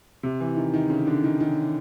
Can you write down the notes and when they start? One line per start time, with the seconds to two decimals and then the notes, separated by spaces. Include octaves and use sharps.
0.23 C3
0.40 E3
0.57 D#3
0.74 D#3
0.90 C#3
1.07 D3
1.24 D#3
1.40 D#3